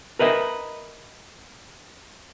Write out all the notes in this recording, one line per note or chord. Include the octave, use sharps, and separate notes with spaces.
A#4 B4 D#5 E5